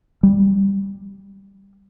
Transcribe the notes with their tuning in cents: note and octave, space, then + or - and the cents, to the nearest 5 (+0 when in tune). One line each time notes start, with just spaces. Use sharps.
G3 +5